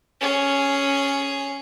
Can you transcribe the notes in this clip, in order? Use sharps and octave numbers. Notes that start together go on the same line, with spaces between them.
C#4 G#4